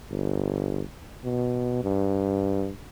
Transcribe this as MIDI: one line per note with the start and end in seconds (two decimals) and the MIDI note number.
0.10 0.81 31
1.24 1.80 47
1.84 2.71 43